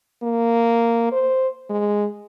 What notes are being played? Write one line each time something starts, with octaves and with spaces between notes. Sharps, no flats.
A#3
C5
G#3